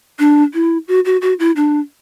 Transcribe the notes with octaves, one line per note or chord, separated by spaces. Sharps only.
D4
E4
F#4
F#4
F#4
E4
D4